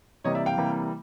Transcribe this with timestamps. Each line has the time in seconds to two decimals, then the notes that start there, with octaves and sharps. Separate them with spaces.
0.24 C3 E3 G3 A#3 C#5 D#5
0.35 D5 E5
0.46 F5 G5
0.57 C3 E3 G3 A#3